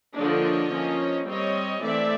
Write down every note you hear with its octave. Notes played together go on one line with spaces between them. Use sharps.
D3 F3 A#3 D4 C#5 D#5
F3 A#3 C#4
G3 C4 C#5 D#5
E3 A3 C4 D5 E5